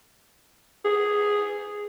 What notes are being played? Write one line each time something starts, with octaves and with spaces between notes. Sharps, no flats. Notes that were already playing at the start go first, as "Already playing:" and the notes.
G#4